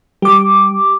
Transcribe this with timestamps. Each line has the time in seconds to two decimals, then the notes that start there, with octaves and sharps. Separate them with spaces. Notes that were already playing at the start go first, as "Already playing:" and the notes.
0.22 G3 G4 D6